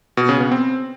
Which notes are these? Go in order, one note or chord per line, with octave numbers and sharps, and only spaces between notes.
B2
C#3
B3
C4